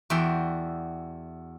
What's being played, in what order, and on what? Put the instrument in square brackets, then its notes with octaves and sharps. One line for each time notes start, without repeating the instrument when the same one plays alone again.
[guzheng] E2 F#4 D5 E5 G5 C6